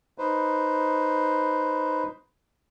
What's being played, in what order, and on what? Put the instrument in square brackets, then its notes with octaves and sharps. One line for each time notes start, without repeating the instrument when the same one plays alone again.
[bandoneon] D#4 B4 C5